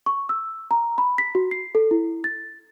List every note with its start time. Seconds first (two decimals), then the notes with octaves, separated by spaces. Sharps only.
0.06 C#6
0.29 E6
0.71 A#5
0.98 B5
1.18 B6
1.35 F#4
1.51 C7
1.75 A4
1.91 E4
2.24 A6